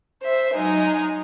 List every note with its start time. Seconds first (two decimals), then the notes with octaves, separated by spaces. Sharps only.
0.21 C5 E5
0.54 F#3 G#3 D#4